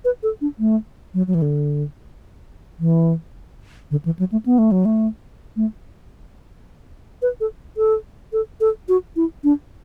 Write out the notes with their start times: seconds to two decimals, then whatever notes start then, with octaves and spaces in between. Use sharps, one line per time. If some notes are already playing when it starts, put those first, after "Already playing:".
0.05 B4
0.23 A4
0.41 D4
0.59 A3
1.14 F#3
1.27 F#3
1.34 E3
1.42 D3
2.80 E3
3.91 D3
4.05 E3
4.19 F#3
4.32 A3
4.46 B3
4.58 A3
4.72 F#3
4.85 A3
5.56 A3
7.22 B4
7.40 A4
7.77 A4
8.33 A4
8.61 A4
8.89 F#4
9.16 E4
9.44 D4